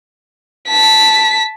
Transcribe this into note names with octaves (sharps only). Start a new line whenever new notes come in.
A5 B6